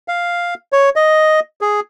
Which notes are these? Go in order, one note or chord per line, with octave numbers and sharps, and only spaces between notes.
F5
C#5
D#5
G#4